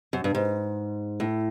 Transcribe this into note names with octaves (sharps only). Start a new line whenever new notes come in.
F#2
G2
G#2
A2